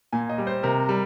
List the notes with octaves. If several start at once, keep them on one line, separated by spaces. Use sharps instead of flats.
A#2 G#5
D#5
G3
C5
C3 A#4
G3